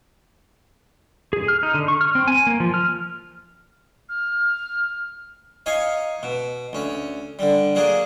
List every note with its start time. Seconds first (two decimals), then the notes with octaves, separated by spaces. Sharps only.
1.33 G#4
1.48 F6
1.63 D#4
1.74 D3
1.88 C#6
2.01 F6
2.15 C4
2.28 G#5
2.47 A#3
2.60 F3
2.74 F6
4.09 F6
5.66 D#4 C#5 F5 G#5
6.23 B2
6.73 D2 C#4
7.39 D3 G3
7.75 F#3 A#3 D4 G#4